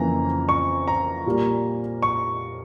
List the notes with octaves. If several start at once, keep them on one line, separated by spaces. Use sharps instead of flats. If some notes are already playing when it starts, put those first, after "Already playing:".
Already playing: F2 C#3 E3 A#3 A#5
C#6
A#5
A#2 G3 A#3
C#6